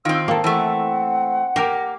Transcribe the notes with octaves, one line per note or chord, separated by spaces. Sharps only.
D#3 C4 F4 E6
A#3 A4 G5
E3 A3 C4 F#5
A#3 G4 A#4